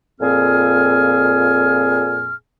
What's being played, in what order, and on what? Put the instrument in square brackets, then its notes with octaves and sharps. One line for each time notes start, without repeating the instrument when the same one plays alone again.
[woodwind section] F2 A#2 C4 G#4 G#5 F6